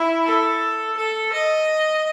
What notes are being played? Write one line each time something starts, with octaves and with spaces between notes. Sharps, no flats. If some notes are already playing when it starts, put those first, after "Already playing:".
Already playing: E4
A4
A4
D#5